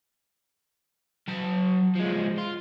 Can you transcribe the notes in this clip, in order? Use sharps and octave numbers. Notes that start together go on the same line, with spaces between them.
F#3 A5
F3 G#3
F4